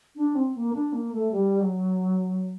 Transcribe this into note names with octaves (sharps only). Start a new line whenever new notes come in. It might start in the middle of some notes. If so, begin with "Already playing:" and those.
D4
C4
A#3
D4
A#3
A3
G3
F#3